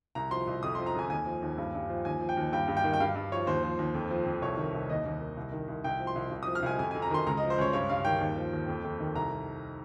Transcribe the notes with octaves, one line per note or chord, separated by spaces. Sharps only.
C2 A#5
F3 C6
C2
F2 D#6
F3 C6
A#5
F2 G#5
D#2 G#5
F3
D#2
G2
G2
F3
D#2 G#5
F3
G5
D#2
G2 G5
G2
G5
D#3
G5
G2 F5
G2
F3 C#5
D#2 C5
F3
D#2
F2
F3
F2
C2 C#5
D#3
C2
D#2 D#5
D#2
D#3
C2
D#3
C2
C2 G5
F3
C6
C2
C2
F3 D#6
F6
C2 G#5
F2 G#5
F2 G#5
A#5
D#3 C6
C#2 A#5
D#5
F3
C5
C#2 C#5
G2 C#5
G2 F5
D#3 G5
D#2
F3
D#2
F2
F2
D#3
C2 A#5